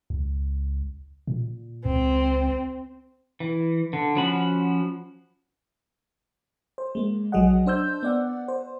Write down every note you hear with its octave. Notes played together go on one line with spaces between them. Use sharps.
C#2
A#2
C#2 C4
E3
D3
F3 C#4 F#4 B5
C5
G#3 A#3
A#1 F#3 G#4 D#5 F#5
D4 C5 E6 G6
B3 D5 F#5
C5